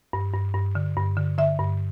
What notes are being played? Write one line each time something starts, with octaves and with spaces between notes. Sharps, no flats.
G2
G2
G2
D3
G2
D3
D3 E5
G2